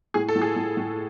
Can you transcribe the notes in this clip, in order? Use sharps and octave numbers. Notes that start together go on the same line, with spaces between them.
A2 G#4
A4
A2
G#4
A2
A2